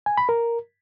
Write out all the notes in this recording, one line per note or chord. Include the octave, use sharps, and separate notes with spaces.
G#5
B5
A#4